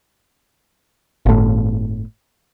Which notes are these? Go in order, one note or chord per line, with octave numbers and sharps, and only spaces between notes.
G1 A2